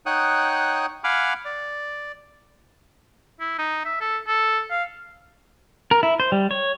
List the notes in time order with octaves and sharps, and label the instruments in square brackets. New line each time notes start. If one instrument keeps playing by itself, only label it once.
[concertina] D#4 C#5 F#5 G5 D#6 F#6
F5 F#5 G#5 B5 D6 F6
D5
[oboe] E4
D#4
E5
A4
A4
F5
[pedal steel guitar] A#4
E4
C5
G3
C#5